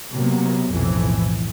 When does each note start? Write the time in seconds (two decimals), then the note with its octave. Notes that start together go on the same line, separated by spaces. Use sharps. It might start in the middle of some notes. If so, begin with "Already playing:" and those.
0.12 C3 F#3 A#3 B3
0.72 B1 F2 A2 E3